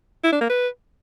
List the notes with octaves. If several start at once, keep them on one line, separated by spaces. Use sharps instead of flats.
E4
D4
A#3
B4